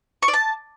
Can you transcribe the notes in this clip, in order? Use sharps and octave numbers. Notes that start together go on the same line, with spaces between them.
C#6
D5
A5